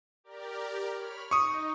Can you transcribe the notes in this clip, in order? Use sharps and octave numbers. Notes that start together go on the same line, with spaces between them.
G4 A#4 D5
C#5 B5 F6
D#4 C#6 D#6